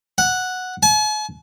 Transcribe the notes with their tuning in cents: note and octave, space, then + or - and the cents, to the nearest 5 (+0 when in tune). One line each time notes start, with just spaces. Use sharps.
F#5 -5
G#5 +45